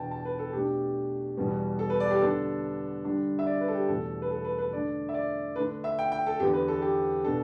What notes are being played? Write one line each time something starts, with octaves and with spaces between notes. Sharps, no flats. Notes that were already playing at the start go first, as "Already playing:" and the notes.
Already playing: E2 B2 B3 D4 G5 A5
A5
B4
A4
B2 A3 D4 G4
E2 B2 G3 B3
A4
B4
D5
G4
D3 B3 D4 A4
D3 G3 D4
E5
D5
B4
A4
G4
E2 B2 A3 A4
B4
A4
B4
B4
D3 A3 D4 D5
E5
D5
D3 A3 D4 B4
E5
G5
G5
A4
E2 D3 B3 G4
B4
A4
G4
B2 B3 D4 A4